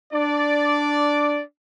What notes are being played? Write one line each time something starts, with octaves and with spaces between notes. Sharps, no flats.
D4 D5